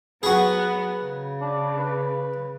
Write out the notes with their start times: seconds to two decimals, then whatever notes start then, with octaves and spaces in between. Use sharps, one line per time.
0.23 F#3 B3 F#4 G#4 B4
1.02 C#3
1.41 D4
1.78 B4